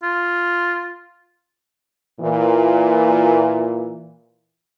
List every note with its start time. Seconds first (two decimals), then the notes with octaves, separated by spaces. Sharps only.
0.03 F4
2.21 A#2 E3